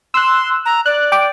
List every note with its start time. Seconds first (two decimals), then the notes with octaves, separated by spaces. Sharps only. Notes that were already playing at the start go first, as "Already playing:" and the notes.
0.14 C6 E6 F#6
0.65 A#5
0.86 D5 F#6
1.12 G5 D6